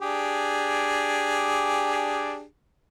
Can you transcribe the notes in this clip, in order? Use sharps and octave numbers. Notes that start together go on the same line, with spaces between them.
D4 G4 G#4